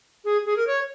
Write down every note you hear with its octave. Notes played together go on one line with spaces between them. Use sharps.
G#4
G#4
A#4
C#5